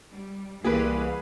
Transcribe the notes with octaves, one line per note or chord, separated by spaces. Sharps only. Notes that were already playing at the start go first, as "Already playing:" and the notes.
G3
C2 E3 A#3 G4 G#4 B4 F5